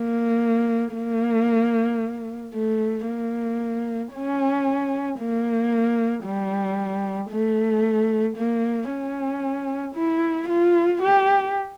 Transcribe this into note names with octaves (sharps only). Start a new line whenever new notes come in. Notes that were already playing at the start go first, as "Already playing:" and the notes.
Already playing: A#3
A#3
A3
A#3
C#4
A#3
G3
A3
A#3
C#4
E4
F4
G4